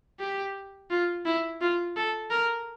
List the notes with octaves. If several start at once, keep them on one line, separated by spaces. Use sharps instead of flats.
G4
F4
E4
F4
A4
A#4